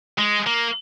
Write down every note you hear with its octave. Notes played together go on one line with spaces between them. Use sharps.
G#3
A#3